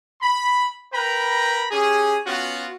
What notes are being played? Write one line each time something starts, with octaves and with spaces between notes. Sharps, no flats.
B5
A#4 B4 G5 A#5 B5
C#4 G4 G#4
B3 C#4 F4 F#4